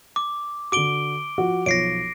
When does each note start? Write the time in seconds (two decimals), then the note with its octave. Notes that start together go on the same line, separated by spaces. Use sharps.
0.16 D6
0.72 D3 F#4 D6 D7 G7
1.38 F3 F#4
1.66 B1 F3 C#5 A#6 C7 D7